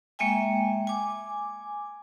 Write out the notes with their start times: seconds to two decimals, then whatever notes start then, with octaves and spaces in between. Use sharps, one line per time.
0.19 G#3 A#3 E5 G5 G#5
0.87 G#5 D6